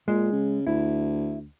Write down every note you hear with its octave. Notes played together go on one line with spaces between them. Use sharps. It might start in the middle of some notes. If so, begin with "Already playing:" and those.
A#2 G#3
C#3
D2 E4